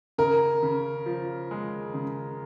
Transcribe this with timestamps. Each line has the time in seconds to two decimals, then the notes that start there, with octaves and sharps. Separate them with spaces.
0.18 C#3 A#4
0.63 C#3
1.06 F3
1.51 G#3
1.94 C#3